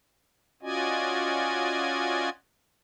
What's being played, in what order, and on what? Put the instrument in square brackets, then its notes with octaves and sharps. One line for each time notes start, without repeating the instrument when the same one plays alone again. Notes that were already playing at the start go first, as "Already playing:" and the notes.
[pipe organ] C#4 F4 F#4 D5 D#5 G#5